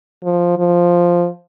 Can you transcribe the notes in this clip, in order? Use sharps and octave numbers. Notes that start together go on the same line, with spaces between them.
F3
F3